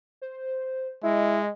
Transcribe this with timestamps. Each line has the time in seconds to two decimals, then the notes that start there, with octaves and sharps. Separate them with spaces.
0.22 C5
1.03 G#3 E4 D#5